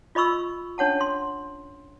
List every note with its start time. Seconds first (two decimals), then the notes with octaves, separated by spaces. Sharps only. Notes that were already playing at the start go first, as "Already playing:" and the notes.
0.15 F4 D#5 B5 C#6 E6
0.78 C#4 D4 C#5 F#5 A5
1.01 C6